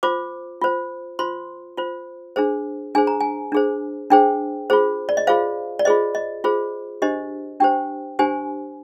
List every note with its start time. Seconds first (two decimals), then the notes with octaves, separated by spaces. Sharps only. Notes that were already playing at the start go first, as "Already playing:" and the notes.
0.03 F4 C5 D6
0.61 F4 C5
1.19 F4 C5 C6
1.77 F4 C5
2.36 D4 G#4 C5
2.95 D4 G#4 C5 G#5
3.07 A#5
3.21 G#5
3.52 D4 G#4 C5
4.10 D4 G#4 C5 G5
4.70 F4 G#4 C5
5.09 D5
5.17 D#5
5.27 F4 G#4 C5 F5
5.79 D5
5.85 F4 G#4 C5 D#5
6.15 D#5
6.44 F4 G#4 C5
7.02 D4 G4 C5 D#5
7.60 D4 G4 C5 G5
8.19 D4 G4 C5 G#5